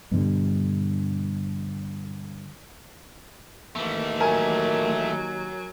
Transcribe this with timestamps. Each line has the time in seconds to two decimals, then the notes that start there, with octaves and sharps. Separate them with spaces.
0.11 G2 B2 D3 G3
3.75 D#2 E3 A3
4.20 F#3 A#4 G#5